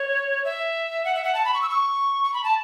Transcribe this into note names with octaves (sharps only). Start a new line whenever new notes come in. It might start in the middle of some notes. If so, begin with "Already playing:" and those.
Already playing: C#5
E5
F#5
E5
F#5
A5
B5
C#6
E6
C#6
C#6
B5
A5